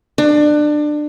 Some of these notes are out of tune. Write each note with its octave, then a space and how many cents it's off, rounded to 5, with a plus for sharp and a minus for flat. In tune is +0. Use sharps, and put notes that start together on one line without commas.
D4 +25